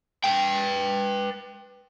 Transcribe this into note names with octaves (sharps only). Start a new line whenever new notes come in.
B4 G5